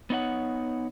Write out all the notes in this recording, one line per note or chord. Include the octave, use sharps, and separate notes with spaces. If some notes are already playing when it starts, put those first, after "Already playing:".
B3 D#4 C#5 F#5